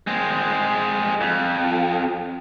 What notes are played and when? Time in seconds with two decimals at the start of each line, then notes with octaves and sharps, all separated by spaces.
0.07 G#3 C4
1.21 F2